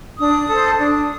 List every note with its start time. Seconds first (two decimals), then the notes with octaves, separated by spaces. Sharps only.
0.18 D4 D#6
0.48 A4 C5
0.78 D4 D#6